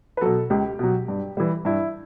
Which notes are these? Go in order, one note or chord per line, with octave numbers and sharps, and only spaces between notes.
B4
B2 F#3 A4
C#2 G4
B2 F#3
G2
E3 G3
G2 E4